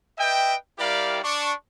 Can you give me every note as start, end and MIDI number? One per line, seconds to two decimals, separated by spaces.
0.18 0.55 71
0.18 0.55 75
0.18 0.55 76
0.18 0.55 79
0.79 1.19 55
0.79 1.19 64
0.79 1.19 67
0.79 1.19 70
0.79 1.19 74
0.79 1.19 77
1.24 1.53 62
1.24 1.53 85